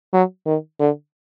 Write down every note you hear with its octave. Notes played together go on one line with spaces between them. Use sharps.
F#3
D#3
D3